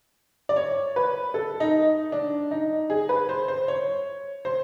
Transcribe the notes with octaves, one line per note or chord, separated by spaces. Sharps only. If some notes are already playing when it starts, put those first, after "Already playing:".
D5
C#5
B4
A4
D#4
D4
D#4
G#4
B4
C5
C5
C#5
C5